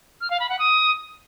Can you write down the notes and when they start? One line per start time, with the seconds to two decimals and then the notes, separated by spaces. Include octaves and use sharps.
0.21 F6
0.30 F5
0.40 B5
0.49 F#5
0.59 D#6